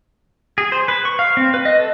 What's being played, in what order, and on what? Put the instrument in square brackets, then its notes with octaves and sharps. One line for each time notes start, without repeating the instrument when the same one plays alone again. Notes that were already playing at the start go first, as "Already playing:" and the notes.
[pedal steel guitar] G#4
C5
B4
C#6
F5
C4
B4
D#5
A4